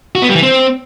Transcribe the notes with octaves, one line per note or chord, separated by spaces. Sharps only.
F#4
B3
G3
E3
C4